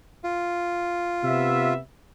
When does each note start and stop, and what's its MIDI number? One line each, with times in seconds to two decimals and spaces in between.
0.24 1.74 65
1.24 1.79 48
1.24 1.79 59
1.24 1.79 76